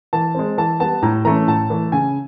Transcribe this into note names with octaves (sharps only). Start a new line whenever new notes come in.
E3 A5
G#3 C4
E3 A5
G3 B3 A5
A2 A#5
E3 A3 C#4 A#5
A2 A5
E3 A3
C#3 G#5